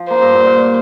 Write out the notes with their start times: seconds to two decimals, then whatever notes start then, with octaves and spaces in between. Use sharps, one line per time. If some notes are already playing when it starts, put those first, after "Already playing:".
Already playing: F3
0.10 A#3 C5
0.22 G2
0.34 A#2
0.46 A#2